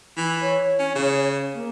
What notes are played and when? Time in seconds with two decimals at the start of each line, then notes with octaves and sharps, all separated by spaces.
0.17 E3
0.41 C#5
0.79 C#4
0.96 C#3
1.54 A#3